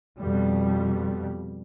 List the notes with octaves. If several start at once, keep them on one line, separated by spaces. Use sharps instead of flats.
F2 B2 G3